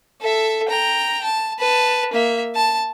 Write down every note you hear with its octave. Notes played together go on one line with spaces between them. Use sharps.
A4 E5
G5 A#5
A5
B4 A5
A#3 E5
A5